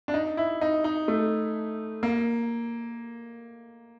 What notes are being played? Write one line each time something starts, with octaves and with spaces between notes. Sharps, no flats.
D4
D#4
E4
D#4
D#4
A3
A#3